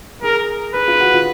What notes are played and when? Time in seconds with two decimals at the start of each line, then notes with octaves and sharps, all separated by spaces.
0.22 G#4 A#4
0.74 G#4 B4
0.88 F4
1.00 F#4
1.14 F4